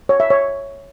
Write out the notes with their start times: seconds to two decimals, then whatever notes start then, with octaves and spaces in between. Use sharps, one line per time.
0.09 C#5
0.20 E5
0.30 C#5